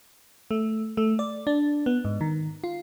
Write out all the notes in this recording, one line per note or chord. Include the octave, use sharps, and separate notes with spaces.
A3
A3
D5
D4
B3
G#2
D#3
F4